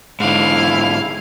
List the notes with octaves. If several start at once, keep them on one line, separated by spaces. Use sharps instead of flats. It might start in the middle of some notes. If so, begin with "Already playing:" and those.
G#2 D3 E4 F5